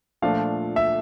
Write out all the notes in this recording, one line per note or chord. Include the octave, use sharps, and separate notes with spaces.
A#2 F3 A3 D4 F5
E5